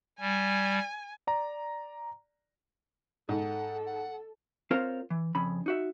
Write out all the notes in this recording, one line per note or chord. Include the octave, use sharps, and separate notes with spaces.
G3 G#5
D5 A#5
G#2 A4 F#5
F#5
C4 F4 A#4 C5 C#5 F5
E3
F2 C#3 B5
D#4 F#4 E5